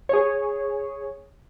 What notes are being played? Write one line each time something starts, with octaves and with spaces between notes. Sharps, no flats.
G#4 C#5